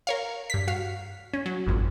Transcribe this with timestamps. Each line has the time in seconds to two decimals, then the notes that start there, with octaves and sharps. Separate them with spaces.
0.07 A#4 C#5 F5
0.50 G2 B6
0.68 F#4 F5
1.34 C#4
1.46 F#3
1.67 G#1 F2